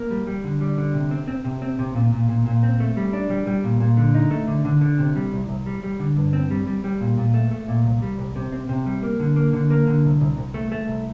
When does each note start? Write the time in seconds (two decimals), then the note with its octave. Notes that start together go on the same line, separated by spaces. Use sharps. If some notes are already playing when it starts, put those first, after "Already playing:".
Already playing: A#3
0.10 G3
0.27 G3
0.44 D3
0.61 G3
0.78 D3
0.94 C3
1.11 C4
1.28 C4
1.45 C3
1.62 C4
1.79 C3
1.95 A#2
2.12 A#2
2.29 A#2
2.46 A#2
2.63 C4
2.80 A3
2.97 G3
3.13 D4
3.30 G3
3.47 G3
3.64 A#2
3.80 A#2
3.97 D3
4.15 D#4
4.31 A3
4.48 D3
4.65 D3
4.81 D3
4.99 C3
5.16 G3
5.33 C2
5.49 C2
5.66 G3
5.83 G3
5.99 D3
6.16 G2
6.33 C4
6.51 G3
6.67 G3
6.84 G3
7.01 A#2
7.17 A#2
7.34 A3
7.51 A3
7.68 A#2
7.85 C2
8.02 G3
8.18 C2
8.36 C3
8.52 C4
8.69 C3
8.86 G3
9.03 A#3
9.20 D3
9.36 A#3
9.53 D3
9.70 A#3
9.87 D3
10.04 C2
10.20 C2
10.37 C2
10.54 A3
10.72 A3
10.88 C2